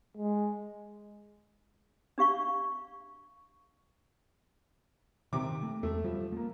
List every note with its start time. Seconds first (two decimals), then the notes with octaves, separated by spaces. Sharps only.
0.17 G#3
2.18 D4 G4 F5 C#6
5.33 C3 D#3 D6
5.63 A3
5.83 E2 A3
6.04 F3 G3
6.32 A3 A#3